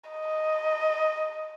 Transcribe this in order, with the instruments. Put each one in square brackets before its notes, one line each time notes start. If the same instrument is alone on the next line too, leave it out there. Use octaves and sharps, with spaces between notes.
[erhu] D#5